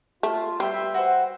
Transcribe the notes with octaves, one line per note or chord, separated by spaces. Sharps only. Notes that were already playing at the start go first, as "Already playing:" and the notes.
A3 F4
G3 B4 E5 G5 C6
F#4 C5